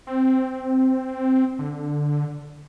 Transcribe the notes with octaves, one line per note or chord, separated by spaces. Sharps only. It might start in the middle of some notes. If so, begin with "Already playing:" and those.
C4
D3